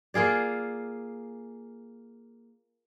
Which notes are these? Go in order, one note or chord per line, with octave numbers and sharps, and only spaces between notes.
A#3 F4 G#4 D5